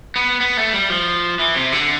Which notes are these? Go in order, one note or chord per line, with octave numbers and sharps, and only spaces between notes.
B3
B3
A3
G3
F3
E3
C3
D3